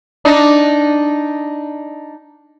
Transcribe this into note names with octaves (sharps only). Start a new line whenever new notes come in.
D4 D#4